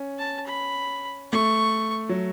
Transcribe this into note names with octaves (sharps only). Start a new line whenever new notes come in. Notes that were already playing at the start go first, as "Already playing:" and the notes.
Already playing: C#4
A5
B5
A3 C#6
F#3